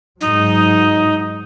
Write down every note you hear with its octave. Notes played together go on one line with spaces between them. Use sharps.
G#2 F#3 D#4